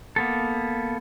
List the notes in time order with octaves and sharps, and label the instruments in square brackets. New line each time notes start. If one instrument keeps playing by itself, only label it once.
[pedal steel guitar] A#3 B3 A4